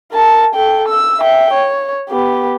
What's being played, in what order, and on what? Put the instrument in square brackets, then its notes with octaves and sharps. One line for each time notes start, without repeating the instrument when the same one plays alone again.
[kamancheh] A#4 A5
A4 G5
E6
E5 G5
C#5
B3 G4